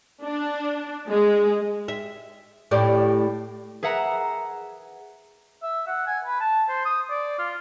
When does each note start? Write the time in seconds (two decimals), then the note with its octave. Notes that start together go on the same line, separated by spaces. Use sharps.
0.24 D4
1.10 G#3
1.88 E5
2.71 A2 G4 D5
3.83 G#4 B4 E5 F#5 A#5
5.63 E5
5.87 F#5
6.06 G#5
6.25 B4
6.40 A5
6.69 C5
6.85 D#6
7.10 D5
7.39 F4